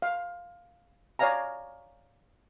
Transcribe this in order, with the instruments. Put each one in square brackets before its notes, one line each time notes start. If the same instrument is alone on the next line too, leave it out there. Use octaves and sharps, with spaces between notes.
[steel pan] F5
C#5 D5 F5 G#5 A#5